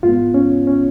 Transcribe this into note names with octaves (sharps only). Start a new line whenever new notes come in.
G#2 G#3 B3 F4
C#4
C#4